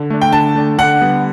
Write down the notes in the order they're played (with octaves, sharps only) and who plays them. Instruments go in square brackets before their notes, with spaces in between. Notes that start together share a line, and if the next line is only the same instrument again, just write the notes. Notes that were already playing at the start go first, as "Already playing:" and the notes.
Already playing: [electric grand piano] D3
A3 D4
[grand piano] G5
[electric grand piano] D3 [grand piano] A5
[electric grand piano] A3 D4
[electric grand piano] D3 [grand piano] F#5
[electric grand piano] G3 B3